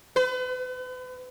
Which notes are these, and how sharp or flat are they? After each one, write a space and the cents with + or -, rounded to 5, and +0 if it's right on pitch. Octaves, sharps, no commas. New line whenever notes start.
B4 +40